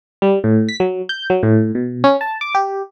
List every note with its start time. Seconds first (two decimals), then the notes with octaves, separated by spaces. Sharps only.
0.22 G3
0.44 A2
0.69 B6
0.80 F#3
1.09 G6
1.30 F#3
1.43 A2
1.75 B2
2.04 C#4
2.21 A5
2.41 D6
2.55 G4